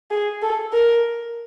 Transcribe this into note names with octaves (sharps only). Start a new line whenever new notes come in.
G#4
A4
A#4